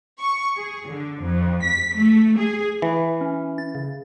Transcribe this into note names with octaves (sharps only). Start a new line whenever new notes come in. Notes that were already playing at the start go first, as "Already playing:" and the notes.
C#6
G#4
D3
F2
B6
A3
G#4
E3
C#4
A6
C#3